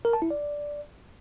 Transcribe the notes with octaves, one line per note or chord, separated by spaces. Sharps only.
A#4
A5
E4
D5